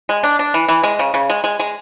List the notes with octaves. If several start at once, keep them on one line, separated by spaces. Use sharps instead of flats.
G#3
D4
D4
E3
E3
G#3
C#3
C#3
G#3
G#3
G#3